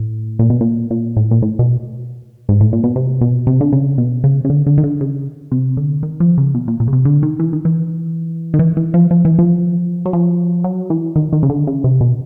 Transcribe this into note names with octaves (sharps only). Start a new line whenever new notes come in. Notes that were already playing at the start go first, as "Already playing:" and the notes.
Already playing: A2
A#2
B2
A#2
A#2
A2
A#2
A2
B2
G#2
A2
A#2
B2
C3
B2
C3
D3
C#3
B2
C#3
C#3
D3
D3
D#3
D3
C#3
C3
D3
D#3
F3
C#3
B2
A#2
A#2
C#3
C3
D3
D#3
E3
D#3
E3
D#3
E3
E3
F3
F3
E3
F3
F#3
F3
F#3
E3
D#3
D#3
C#3
D3
C#3
C3
B2